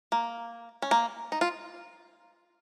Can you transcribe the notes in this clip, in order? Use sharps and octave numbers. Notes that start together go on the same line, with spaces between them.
A#3
C#4
A#3
D#4
F4